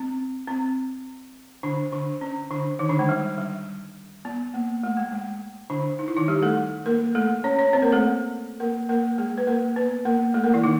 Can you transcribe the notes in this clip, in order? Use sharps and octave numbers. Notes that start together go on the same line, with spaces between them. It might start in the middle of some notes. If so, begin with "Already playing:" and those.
Already playing: C4
C4
D3 D4
D3 D4
C#4
D3 D4
D#3 D#4
D3 D4
G#3
G3
G3
B3
A#3
A3
G#3
G#3
D3 D4
D#4
E4
D#3 D#4
G3 G4
A3 A4
A#3 A#4
A3 A4
C#4 C#5
C#4 C#5
C4 C5
A#3 A#4
A3 A4
A#3 A#4
A#3 A#4
G#3 G#4
B4
A#3 A#4
B3 B4
A#3 A#4
A3 A4
A#3 A#4
E3 E4
D#3 D#4